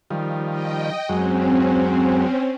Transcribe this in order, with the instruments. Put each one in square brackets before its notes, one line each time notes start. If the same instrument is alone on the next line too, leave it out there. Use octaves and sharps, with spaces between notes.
[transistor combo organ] D#3 F3 G3
[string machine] D#5 G5
[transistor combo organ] F#2 F#3 G#3 [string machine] C4 C#4